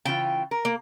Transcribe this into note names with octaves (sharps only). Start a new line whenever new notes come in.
C#3 E3 F4 G5
A#4
A#3